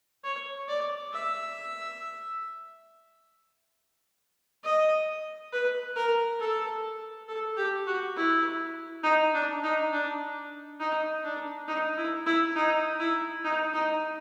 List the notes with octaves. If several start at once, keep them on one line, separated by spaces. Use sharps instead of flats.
C#5
D5
E5
D#5
B4
A#4
A4
A4
G4
F#4
E4
D#4
D4
D#4
D4
D#4
D4
D#4
E4
E4
D#4
E4
D#4
D#4